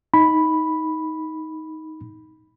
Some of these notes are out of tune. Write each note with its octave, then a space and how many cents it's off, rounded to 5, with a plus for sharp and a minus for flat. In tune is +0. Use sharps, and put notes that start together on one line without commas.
D#4 +15 B5 +0